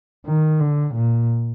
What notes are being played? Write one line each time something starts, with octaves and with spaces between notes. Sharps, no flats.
D#3
D3
A#2